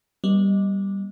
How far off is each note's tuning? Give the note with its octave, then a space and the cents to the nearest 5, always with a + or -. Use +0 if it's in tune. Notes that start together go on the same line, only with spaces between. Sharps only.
G3 +0 B3 -35 D#5 +0